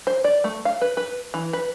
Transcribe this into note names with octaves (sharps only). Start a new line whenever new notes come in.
C5
D5
A3
F5
B4
B4
E3
B4